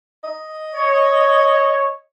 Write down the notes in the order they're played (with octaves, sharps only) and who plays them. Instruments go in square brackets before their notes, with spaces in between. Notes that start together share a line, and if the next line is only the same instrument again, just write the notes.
[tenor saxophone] D#5
[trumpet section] C#5